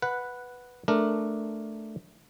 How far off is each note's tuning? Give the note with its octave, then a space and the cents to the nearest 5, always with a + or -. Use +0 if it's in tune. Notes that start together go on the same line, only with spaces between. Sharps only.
B4 +0 F#5 -5
A3 +0 D4 +5 A#4 +0